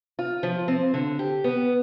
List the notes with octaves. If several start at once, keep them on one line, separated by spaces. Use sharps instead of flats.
F4
F3
C4
D3
G4
B3